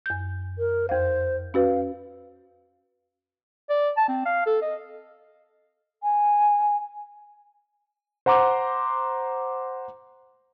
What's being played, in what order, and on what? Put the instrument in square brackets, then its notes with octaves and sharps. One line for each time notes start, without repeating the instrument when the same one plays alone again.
[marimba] F#2 G6
[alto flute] A#4
[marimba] F2 F5 [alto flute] C5
[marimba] C#4 F#4 B4 [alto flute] F5
[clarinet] D5
A5
C4
F5
A4
D#5
[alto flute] G#5
[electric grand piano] C5 F#5 A#5 C6 D6